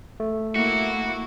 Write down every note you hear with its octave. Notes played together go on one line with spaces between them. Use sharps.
A3
A#3 E4 F#4